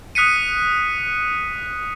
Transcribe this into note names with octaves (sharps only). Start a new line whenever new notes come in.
D#6 F#6 B6 C#7 D#7